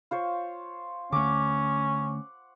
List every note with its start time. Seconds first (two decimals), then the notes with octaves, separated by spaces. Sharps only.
0.11 F4 C5 C#5
1.12 D3 A3 C#4 F#5 D6